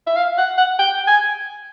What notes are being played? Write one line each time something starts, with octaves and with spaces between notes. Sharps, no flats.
E5
F5
F#5
F#5
G5
G#5